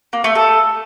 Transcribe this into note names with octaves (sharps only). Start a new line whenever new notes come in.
A#3
A3
A4